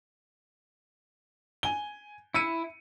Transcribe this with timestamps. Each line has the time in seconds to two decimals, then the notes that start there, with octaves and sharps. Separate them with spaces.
1.63 G#5 G7
2.34 E4 E6 C#7 D#7